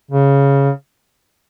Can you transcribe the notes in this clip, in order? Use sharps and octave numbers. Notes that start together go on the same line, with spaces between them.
C#3